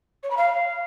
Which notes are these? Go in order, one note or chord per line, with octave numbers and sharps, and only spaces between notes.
C#5
B5
F5